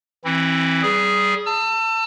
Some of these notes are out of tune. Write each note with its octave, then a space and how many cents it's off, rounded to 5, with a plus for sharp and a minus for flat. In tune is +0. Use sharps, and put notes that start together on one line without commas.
E3 +5 C4 +25 E4 -15
G3 -20 G#4 +0
A5 +30 E6 +25